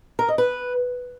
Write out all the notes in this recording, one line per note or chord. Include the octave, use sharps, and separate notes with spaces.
A#4
D#5
B4